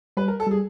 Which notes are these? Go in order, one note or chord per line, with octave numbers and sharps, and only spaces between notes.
G3 B4
A#4
A4
G3 G#4